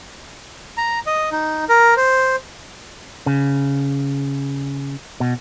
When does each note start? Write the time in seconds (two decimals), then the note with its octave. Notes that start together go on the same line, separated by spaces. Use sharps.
0.77 A#5
1.07 D#5
1.32 D#4
1.69 A#4
1.97 C5
3.26 C#3
5.20 B2